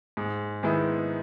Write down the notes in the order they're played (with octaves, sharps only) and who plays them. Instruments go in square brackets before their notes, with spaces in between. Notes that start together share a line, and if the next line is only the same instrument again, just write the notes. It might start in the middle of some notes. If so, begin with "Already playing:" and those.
[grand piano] G#2
D#3 G#3 B3 E4